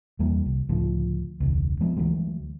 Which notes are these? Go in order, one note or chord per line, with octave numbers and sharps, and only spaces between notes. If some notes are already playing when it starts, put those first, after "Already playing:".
E2 D#3 G3 A#3
C2
C#2 A2 D3 F3
E1 C#2
F3 G#3 B3
D2 E3 F#3 G#3